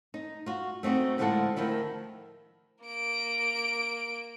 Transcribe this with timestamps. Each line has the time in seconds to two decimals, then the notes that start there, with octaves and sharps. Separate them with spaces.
0.14 D#4
0.46 F4 F#4
0.83 A3 C4 D#4 F#4 D#5
1.18 A2 D3 F3 G#3 A4 F#5
1.56 D2 D#3 F3 E4
2.84 A#3 D7